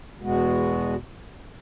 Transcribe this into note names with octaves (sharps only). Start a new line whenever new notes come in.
E2 B2 G#3 B3 F#4